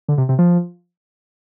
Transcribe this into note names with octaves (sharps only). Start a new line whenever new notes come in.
D3
C3
C3
F3